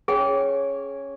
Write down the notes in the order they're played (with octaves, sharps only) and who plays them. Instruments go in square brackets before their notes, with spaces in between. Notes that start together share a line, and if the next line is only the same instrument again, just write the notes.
[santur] C#4 [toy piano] G#4 G5